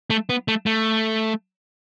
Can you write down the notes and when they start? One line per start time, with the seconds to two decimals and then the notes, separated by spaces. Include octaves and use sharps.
0.10 A3
0.29 B3
0.48 A3
0.66 A3